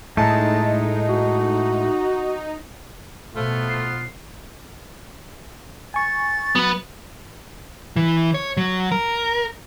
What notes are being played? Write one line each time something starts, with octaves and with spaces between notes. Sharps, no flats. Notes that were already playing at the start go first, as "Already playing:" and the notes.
A2 G#3 A3 D#4 A5
F#4
B2 F3 A3 B3 F4
C6
G#5 C#6 A6
F#3 B3 B4
E3
C#5
F#3
A#4